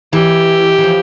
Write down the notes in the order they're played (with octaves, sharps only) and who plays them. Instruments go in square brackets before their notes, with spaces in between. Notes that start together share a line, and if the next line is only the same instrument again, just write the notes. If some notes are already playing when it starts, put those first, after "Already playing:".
[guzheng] E3 [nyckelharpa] G4
[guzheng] E3
F3